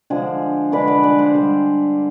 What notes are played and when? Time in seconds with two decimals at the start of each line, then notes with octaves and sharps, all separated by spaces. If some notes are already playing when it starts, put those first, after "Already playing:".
0.10 D3 F3 G#3 G#4 C5
0.72 D3 G#3 B4 D5
0.88 B4 D5
1.03 B4 D5
1.19 G#4 C5
1.34 D3 G3